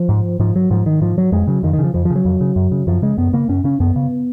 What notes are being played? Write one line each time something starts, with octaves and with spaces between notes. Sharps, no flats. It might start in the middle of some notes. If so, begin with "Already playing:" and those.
Already playing: F3
G#2
G#2 F3
F#3
G#2 F3
D#3
G#2 F3
F#3
F2 G#3
C#3 F#3
F2 D#3
D#3
C#3
F3
F2 F3
F3
C#3
F#3
F2
C#3
F#2
C#3
F#2 F3
C#3 G#3
F#2 B3
C#3 A#3
F#2 C#4
C#3 C#4
F#2 B3
C#3